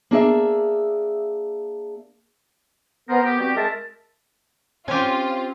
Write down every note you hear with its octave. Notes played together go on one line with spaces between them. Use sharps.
A#3 D4 G#4 E5
B3 A#4 C5
B3 G4
G3 C4 F#4 G4
G#3 A#4 E5 A5
C4 C#4 F4 G4 G#5